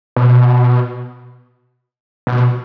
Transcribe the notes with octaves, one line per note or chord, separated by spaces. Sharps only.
B2
B2